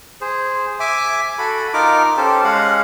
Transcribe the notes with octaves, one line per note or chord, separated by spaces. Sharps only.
G#4 C5
E5 G#5 D6
F#4 A4 B5
D#4 F4 A#4 D6
C#4 G4 A4 C5
G#3 C#4 F5 F#5